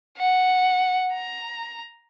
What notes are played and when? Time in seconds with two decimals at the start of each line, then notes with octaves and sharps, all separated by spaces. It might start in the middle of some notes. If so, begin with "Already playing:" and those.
0.18 F#5
1.13 A#5